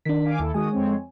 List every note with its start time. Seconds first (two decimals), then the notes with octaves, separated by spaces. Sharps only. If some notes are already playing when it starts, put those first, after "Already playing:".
0.05 D#3 D4 B6
0.25 F5 G#5 D6
0.40 D#2 E4 A4
0.54 D#3 G#3 F#4 G#5 D#6
0.71 F2 C4 C#5